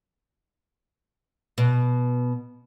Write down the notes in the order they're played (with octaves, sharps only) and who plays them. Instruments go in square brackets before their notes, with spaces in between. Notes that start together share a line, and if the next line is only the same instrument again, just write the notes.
[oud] B2